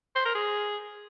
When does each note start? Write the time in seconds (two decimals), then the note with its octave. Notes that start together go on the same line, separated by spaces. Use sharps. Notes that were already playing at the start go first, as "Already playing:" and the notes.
0.15 C5
0.25 A#4
0.35 G#4